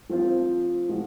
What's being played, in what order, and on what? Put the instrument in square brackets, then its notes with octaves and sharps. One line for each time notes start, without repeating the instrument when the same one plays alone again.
[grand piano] F3 C4 F4 C5
F3 G#3 D#4 F#4